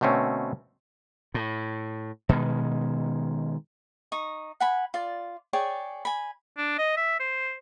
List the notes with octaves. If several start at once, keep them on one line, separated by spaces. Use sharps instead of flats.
B2 D3 A3 C4 C#4
A2
B2 D#3 G#3
D#4 C#6 D#6
F#5 G#5 B5
F4 D5
G#4 C#5 D5 G5
G#5 B5
D4
D#5
E5
C5